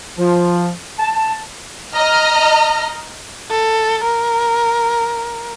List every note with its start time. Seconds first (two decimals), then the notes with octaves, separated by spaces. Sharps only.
0.18 F3
0.99 A5
1.94 D#5 A#5 F6
3.50 A4
4.04 A#4